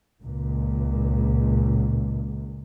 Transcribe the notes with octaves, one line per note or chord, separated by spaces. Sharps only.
C#2 A#2